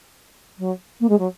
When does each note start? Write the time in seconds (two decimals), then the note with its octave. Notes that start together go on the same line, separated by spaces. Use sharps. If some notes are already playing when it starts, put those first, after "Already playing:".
0.58 F#3
1.00 A#3
1.09 G#3
1.18 F#3